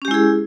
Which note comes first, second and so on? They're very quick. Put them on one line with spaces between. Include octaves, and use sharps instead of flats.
C#4 G4 G#3 E4 G#4